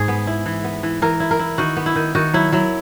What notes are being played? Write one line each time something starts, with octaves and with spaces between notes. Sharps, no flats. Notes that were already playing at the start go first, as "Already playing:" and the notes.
Already playing: G#2 G#4
B3
E4
E3
B3
E3
E3 A#4
E4
A#4
E4
D#3 F#4
B3
E4
D#3
D#3 F#4
F#3 E4
F#3 E4